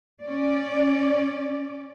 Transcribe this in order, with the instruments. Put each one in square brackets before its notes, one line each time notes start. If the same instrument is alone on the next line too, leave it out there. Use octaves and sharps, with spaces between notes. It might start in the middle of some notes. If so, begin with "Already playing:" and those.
[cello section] C#4 D5